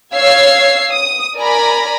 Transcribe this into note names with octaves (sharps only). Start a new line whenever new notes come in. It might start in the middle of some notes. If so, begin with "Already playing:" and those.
C#5 F5 E6 G#6 C7
D#6
A#4 D5 G#5 A#5 B5